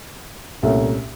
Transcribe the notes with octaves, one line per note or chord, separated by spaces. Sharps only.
C2 A#2 A3 C#4